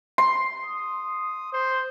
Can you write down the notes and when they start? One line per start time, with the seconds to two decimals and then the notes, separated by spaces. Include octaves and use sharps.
0.18 C6
0.65 D#6
1.53 C5